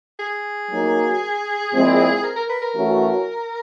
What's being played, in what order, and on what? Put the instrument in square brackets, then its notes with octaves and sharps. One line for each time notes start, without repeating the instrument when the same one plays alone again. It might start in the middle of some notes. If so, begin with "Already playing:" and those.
[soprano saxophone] G#4
[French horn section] F#3 A#3 D#4 F#4
A#2 F3 G#3 C4 E4
[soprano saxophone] A#4
A#4
B4
A#4
[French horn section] E3 A3 C#4 F#4